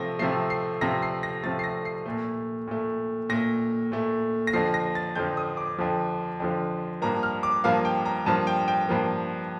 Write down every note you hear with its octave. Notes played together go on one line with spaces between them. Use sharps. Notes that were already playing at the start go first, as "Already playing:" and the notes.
Already playing: C3 F3 A3 A#6
C3 F3 A3 C7
C7
C3 F3 A3 A#6
C7
A#6
C3 F3 A3 A6
C7
A#6
C7
A#2 A3
A#2 A3
A#2 A3 A#6
A#2 A3
A#6
F2 D3 F3 C7
A#6
A6
F2 D3 F3 G6
D#6
D6
F2 D3 F3
F2 D3 F3
G2 F3 A#3 A#5
F6
D6
G2 F3 A#3 F5
G5
A#5
G2 F3 A#3 A5
G5
G5
G2 F3 A#3